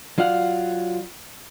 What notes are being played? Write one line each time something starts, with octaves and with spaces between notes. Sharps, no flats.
F#3 F4 D5 F5 F#5